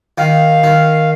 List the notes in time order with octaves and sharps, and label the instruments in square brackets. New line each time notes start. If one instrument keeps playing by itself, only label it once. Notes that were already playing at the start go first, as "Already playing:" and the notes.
[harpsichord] D#3 [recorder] F5
[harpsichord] D#3